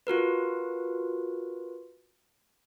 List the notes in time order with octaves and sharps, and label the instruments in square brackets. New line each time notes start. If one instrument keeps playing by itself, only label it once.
[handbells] F4 F#4 A#4 B4